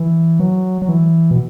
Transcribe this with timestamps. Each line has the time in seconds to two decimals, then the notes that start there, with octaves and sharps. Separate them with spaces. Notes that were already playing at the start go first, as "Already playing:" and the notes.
Already playing: E3
0.40 F#3
0.82 F#3
0.89 E3
1.31 B2